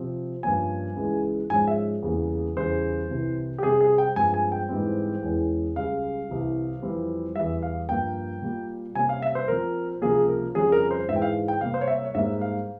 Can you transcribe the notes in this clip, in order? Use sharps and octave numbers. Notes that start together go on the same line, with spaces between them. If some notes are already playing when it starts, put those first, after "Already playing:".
Already playing: C3 F3 C4
G2 F3 A#3 C#4 G#5
C#2 C#3 E3 G#3
G#2 F3 G#3 C#4 G#5
E5
E2 C#3 G3 A#3
E2 C#3 G3 C5
C2 C3 E3
G4
C3 G3 C4 G#4
G#4
G5
G2 F3 G#3 C4 G#5
G#5
G5
G#2 E3 G3 C4
E2 E3 G#3 C#4
C#2 C#3 G3 F5
C2 C3 E3
F2 E3 G3 C4
E2 E3 G3 E5
F5
G2 F3 A#3 G5
A#2 G3 A#3
C3 G3 A#3 C#4 G#5
F5
E5
C5
A#2 F3 C4 A#4
C#2 C3 F3 A#3 G#4
A#4
F2 C#3 G3 C#4 G#4
A#4
C5
G#2 E3 G#3 E5
G5
F5
G5
C3 G3 A#3 F5
C5
C#5
E5
C#5
G#2 G3 A#3 E5
F5